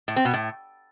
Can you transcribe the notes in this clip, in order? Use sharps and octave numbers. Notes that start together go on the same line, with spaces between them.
A2
C4
B2
A2